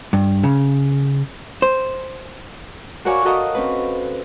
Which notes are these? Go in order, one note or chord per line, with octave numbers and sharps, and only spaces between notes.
G2
C#3
C5
F#4 A#4 C#5 D5 F5 G#5
F#4 A4 A#4 D#5 F5
C4 C#4 B4